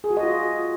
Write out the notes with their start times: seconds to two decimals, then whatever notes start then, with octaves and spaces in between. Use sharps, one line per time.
0.04 G#4
0.10 F#4
0.17 D#5
0.23 F4